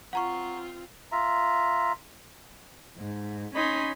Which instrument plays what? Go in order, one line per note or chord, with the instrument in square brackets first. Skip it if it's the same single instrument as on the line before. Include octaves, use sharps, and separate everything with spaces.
[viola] C4 F4 [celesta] F#5 A#5 C#6
[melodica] F4 E5 A#5
[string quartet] G#2
C#4 D#4 B5 C6